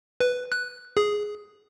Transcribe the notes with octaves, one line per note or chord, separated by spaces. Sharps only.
B4
F#6
G#4